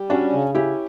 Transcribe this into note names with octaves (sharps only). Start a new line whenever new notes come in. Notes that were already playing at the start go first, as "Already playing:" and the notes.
Already playing: G3
C#4 D4 F#4
C#3
C#4 E4 G4